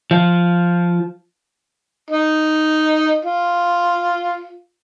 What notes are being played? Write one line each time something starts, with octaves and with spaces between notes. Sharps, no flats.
F3
D#4
F4